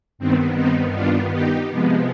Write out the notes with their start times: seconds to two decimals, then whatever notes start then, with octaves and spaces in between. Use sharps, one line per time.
0.18 G2 D#3 B3 C4
0.56 C4 D#4
0.94 D4 F4
1.32 D#4 G4
1.69 C3 F3 G#3 B3